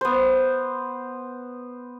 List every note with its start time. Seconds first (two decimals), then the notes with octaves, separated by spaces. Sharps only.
0.01 B3 C5